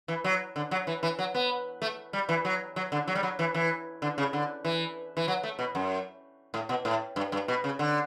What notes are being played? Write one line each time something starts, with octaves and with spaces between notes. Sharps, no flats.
E3
F#3
D3
F#3
E3
E3
F#3
B3
A3
G3
E3
F#3
F#3
D3
F#3
G3
F#3
E3
E3
D3
C#3
D3
E3
E3
F#3
A3
B2
F#2
A2
B2
A2
G2
G2
B2
C#3
D3